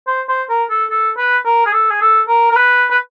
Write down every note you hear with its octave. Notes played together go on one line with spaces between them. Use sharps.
C5
C5
A#4
A4
A4
B4
A#4
G#4
A4
G#4
A4
A#4
A#4
B4
B4